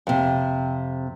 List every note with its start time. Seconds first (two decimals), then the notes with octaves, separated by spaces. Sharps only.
0.07 F2 C3